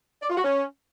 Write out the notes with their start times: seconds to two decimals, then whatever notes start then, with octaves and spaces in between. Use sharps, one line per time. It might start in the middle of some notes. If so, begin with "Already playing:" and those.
0.23 D5
0.30 F4
0.37 F#4
0.45 C#4